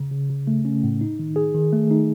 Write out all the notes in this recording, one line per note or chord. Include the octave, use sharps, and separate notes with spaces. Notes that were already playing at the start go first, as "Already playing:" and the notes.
Already playing: C#3
C#3
C#3
A3
C#4
A2
D#4
D#3
G#4
D#3
A3
D#4